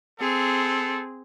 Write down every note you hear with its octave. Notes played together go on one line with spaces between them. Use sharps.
C4 G#4 A4